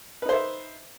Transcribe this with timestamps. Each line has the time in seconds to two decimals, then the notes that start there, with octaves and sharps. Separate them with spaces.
0.22 B4
0.26 D#4
0.29 C5
0.32 E5